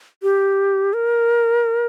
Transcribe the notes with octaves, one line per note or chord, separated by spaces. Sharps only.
G4
A#4